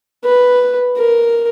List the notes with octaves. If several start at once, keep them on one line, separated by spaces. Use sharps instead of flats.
B4
A#4